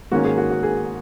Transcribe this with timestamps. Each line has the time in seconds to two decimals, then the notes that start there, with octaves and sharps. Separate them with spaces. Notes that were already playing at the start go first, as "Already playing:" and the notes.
0.12 G#2 D#3 A#3 C#4 F#4
0.25 G#4
0.37 F#4
0.50 F#4
0.63 G#4